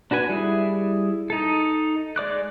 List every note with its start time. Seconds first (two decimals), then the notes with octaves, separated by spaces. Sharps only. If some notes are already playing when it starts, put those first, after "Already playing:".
0.11 D4 F#4 B4 G#5
0.29 G3 E4 G#4
1.30 D#4 A4
2.16 G#3 D5 D6 F#6